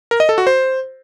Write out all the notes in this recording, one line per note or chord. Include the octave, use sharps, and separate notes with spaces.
A#4
D#5
A4
F#4
C5